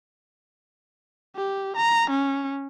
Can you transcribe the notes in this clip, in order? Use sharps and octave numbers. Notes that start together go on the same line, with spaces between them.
G4
A#5
C#4